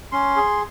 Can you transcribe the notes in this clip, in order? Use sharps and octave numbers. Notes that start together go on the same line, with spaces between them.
C#4 C6
G#4